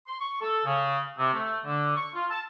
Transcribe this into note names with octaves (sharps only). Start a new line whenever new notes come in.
C6
C#6
A4
C#3
C3
A3
D3
C#6
F4
A5